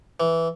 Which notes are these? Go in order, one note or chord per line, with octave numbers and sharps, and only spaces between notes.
E3